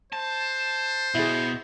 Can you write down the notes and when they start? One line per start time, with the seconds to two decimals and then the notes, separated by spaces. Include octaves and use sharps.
0.13 C5 A5
1.15 B2 E4 G#4